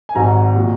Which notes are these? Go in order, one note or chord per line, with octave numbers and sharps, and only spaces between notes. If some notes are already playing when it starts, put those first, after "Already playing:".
G#5
G#1 G#2 F#3 A#5
A#2 F#3